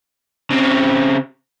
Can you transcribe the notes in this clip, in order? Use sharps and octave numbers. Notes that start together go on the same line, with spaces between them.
C#3 C4